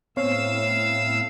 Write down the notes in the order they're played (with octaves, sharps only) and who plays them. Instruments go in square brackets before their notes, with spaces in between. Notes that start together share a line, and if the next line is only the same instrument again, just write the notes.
[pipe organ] A2 E6 [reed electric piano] B3 C4 C#5 [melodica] F5